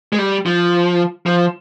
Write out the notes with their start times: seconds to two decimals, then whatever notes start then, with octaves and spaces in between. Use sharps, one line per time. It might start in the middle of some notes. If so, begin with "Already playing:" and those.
0.13 G#3
0.18 G3
0.46 F3
1.26 F3